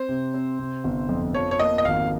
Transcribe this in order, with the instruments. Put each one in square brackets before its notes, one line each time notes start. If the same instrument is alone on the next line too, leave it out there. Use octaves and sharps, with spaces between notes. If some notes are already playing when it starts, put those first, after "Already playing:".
Already playing: [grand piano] C4 [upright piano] C5
[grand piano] C3
C4
C3
G1
F2
[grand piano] F3 [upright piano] C#5
[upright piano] C#5
[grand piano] A#3 [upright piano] D#5
[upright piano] D#5
[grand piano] G#1 [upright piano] F5